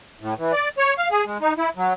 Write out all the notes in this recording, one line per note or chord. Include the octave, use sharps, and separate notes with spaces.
A2
E3
D5
C#5
F5
G#4
G#3
D#4
E4
F#3